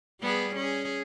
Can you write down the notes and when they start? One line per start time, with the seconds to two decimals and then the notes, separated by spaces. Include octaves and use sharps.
0.21 G3 B3 G#4
0.56 C#4 G#4